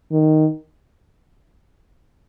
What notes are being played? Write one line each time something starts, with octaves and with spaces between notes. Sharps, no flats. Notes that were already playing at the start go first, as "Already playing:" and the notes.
D#3